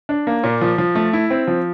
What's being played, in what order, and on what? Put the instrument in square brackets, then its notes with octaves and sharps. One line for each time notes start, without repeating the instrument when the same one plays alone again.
[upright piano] D4
A#3
A#2
F3
F3
A3
E4
C4
F3